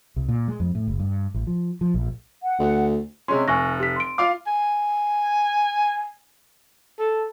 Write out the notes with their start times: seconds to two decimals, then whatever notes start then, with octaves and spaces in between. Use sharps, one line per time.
0.16 C2
0.28 A#2
0.48 G#3
0.60 F2
0.75 A2
0.87 F#1
1.00 G2
1.34 A1
1.47 F3
1.81 F3
1.94 A#1
2.42 F#5
2.59 D2
3.28 C3 G#3 C#4 C6
3.48 F1 G#5 C#6 A#6
3.80 G4 B6
3.96 C6 D7
4.18 F4 F5 D6
4.46 G#5
6.99 A4